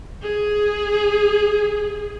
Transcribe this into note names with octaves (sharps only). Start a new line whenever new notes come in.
G#4